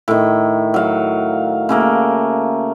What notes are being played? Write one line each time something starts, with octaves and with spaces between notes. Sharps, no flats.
A2 D#3
F#3 F5
C#3 A3 A#3